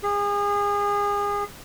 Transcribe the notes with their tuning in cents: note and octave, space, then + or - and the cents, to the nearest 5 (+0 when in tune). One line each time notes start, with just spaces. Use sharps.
G#4 -30